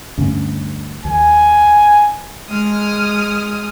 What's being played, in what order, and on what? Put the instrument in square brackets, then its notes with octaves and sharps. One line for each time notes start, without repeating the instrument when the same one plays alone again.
[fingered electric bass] D2 G2 C#4
[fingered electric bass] D#2 [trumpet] G#5
[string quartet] G#3 D#6 F6